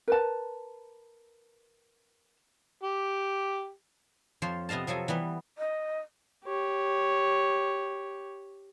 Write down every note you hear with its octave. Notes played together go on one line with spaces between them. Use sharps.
A#4 B4 A5
G4
F2 F3 C5 C#5
C3 B3 D#5 F5 A5
C3 F3 F#3 A4 G#5
E3 G3 B3
D#5
G4 C#5